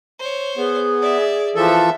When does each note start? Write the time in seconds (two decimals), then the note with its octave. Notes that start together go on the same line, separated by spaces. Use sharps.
0.19 C5 C#5
0.57 B3 G#4
1.02 D5 E5
1.56 E3 F3 A4 E5